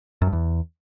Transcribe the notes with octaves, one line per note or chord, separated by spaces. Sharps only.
F#2
G2
E2